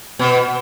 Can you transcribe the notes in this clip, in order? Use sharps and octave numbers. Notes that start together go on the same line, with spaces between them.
B2